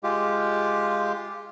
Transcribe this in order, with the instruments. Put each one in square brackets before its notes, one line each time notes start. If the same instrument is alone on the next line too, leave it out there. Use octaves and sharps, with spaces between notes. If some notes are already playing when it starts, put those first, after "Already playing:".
[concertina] G#3 F4 G4